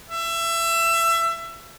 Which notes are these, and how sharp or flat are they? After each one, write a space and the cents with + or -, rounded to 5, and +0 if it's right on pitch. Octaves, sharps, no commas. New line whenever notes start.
E5 +25